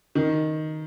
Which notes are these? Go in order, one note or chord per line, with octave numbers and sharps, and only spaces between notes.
D#3